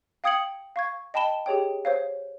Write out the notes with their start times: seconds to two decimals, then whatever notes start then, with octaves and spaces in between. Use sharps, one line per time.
0.24 F5 G5 D#6 G#6 C#7 F#7
0.76 F5 C#6 G#6
1.14 D#5 G5 A5 B5 E7 G7
1.46 G4 G#4 C#5 G5
1.85 C5 C#5 F5